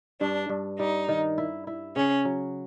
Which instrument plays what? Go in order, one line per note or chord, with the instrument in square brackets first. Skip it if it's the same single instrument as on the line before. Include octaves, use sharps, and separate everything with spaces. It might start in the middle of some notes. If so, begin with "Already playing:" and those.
[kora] G2 [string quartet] D4
[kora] G2
[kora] G3 [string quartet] D#4
[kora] D#3
E4
E4
[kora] C#3 [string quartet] C#4
[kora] F#3